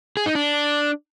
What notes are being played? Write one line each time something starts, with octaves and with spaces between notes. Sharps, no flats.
G#4
D#4
D4